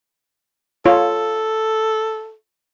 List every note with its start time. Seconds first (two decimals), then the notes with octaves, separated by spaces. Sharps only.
0.86 F4 A4 C#5